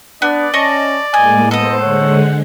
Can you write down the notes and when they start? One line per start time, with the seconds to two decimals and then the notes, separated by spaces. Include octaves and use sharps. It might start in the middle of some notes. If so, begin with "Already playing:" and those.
0.22 B3 D4 D5
0.54 C#4 D#5 A5 C#6
1.14 A2 G#3 A#3 D#5 G#5
1.51 B3 A4 C5 D#5 D#6
1.81 D3 G#3 C#5 F#5